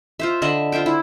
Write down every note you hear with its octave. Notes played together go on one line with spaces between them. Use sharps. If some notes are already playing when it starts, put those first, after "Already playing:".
F4 C5 E5
D3 D#5 E5 B5
F4 C5 E5 G5
E4